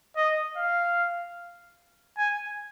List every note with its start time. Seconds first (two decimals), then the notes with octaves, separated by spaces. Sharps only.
0.16 D#5
0.57 F5
2.18 G#5